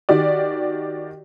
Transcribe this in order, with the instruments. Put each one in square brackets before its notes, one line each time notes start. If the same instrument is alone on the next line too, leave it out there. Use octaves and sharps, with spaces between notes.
[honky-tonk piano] D#3 F#4 G4 D5